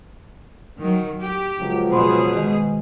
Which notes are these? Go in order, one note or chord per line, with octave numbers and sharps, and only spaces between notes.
D#3 F#3
G4
C#2 F3 F#3
B2 G#4 C5 B5 C6
D#3 G#3